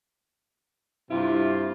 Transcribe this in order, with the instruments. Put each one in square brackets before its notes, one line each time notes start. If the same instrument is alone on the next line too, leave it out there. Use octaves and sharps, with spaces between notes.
[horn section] G2 C3 F4 [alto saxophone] E4